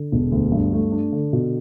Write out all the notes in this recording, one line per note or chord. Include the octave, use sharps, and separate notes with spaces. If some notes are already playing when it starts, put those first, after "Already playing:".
Already playing: D3
E1
D2
G2
A3
D4
D3
B2